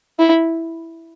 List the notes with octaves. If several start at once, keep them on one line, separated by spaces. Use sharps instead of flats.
E4